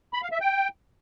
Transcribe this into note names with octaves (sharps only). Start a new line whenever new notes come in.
B5
F5
E5
G5